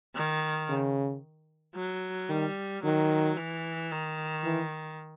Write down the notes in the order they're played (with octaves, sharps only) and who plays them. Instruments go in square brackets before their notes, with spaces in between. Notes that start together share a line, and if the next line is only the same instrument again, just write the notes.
[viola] D#3
[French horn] C#3
[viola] F#3
[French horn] D#3 [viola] G3
[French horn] D#3 [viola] F#3
[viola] E3
D#3
[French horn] E3